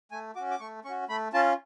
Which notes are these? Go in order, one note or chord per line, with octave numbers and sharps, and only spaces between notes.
A3 G#5
C#4 F#4 D6
D6
A3 C#6
C#4 F#4 C#6
A3 B5
C#4 F4 A5